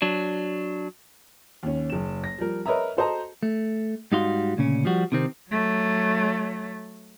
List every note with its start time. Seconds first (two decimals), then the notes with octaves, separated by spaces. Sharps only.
0.02 F#3 D4
1.63 D#2 C#4
1.90 F#1 E7
2.24 A#6
2.38 F3 G3 A#4
2.66 A#4 B4 C#5 D#5 E5 A#5
2.97 F#4 A4 C5 D#5 A5 A#5
3.43 A3
4.12 G#2 G3 D#4 F#4 F5 C6
4.57 D2 A#2 C#3 C#4
4.85 F3 G3 F#4
5.12 C3 D#3 C4
5.50 F#3 A3